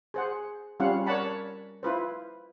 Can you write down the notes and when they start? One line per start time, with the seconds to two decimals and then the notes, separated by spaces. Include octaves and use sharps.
0.14 G#4 C5 F#5
0.80 G3 C4 C#4 F4 F5 F#5
1.07 A#4 C#5 D5 F#5 A5 B5
1.83 E4 F4 B4 C5